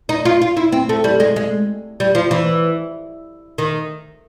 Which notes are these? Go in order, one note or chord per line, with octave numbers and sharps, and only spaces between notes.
D#4
F4
F4
E4
C4
A3
G3
G#3
G#3
G3
F3
E3
D#3